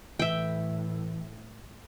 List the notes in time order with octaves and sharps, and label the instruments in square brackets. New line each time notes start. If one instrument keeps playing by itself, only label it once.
[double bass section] A2 [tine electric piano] E3 [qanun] E5 G5